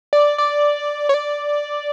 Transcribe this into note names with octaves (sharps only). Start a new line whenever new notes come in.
D5
D5
C#5
D5